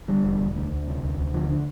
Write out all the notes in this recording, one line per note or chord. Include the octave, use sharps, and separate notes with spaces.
D3 G3
E1
E1
D2
D2
C3
D2
D2
D3 F3
D3